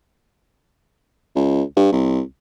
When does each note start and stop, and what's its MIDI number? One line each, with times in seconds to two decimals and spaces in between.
1.36 1.63 37
1.77 1.88 43
1.92 2.21 36